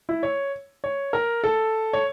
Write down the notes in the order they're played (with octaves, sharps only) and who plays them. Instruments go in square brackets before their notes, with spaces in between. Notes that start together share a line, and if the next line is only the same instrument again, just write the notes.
[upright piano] E4
C#5
C#5
A#4
A4
C#5